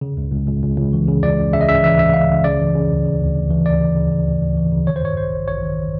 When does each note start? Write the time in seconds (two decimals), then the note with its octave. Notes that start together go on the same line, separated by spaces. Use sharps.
0.01 C#3
0.17 C#2
0.32 C#2
0.48 C#2
0.63 C#2
0.78 C#2
0.93 E3
1.08 C#3
1.23 C#2 D5
1.38 C#2
1.53 C#3 E5
1.61 D#5
1.68 C#3 E5
1.84 E3 E5
1.99 C#2 E5
2.14 C#2 F5
2.29 C#2
2.44 C#3 D5
2.60 E3
2.75 C#3
2.90 D2
3.05 C#3
3.20 D2
3.36 D2
3.51 E3
3.66 D2 D5
3.81 C#3
3.96 C#3
4.11 C#3
4.26 D2
4.42 D2
4.57 E3
4.72 C#3
4.87 D#3 C#5
4.96 C5
5.03 G2 C#5
5.17 A1 C5
5.32 A1
5.48 A1 C#5
5.63 D#3